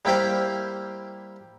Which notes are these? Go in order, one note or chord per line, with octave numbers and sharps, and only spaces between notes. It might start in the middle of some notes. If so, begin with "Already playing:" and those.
G3 A#3 E4 G4 C5 F5